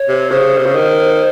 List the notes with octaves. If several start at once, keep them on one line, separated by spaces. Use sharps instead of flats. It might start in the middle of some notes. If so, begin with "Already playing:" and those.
Already playing: C#5
C3
C#3 C5
C3
C#3
D#3